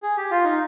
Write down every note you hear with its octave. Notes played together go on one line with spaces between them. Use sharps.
G#4
G4
F4
D#4